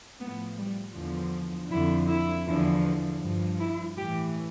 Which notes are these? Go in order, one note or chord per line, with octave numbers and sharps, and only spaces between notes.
A2 F3 B3
G3
E2 D3 F3
F2 D3 F3 E4
E4
E2 D3 F3
G2 F3
E4
A2 E3 G4